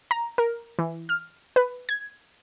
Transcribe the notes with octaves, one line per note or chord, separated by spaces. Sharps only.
A#5
A#4
E3
F6
B4
G#6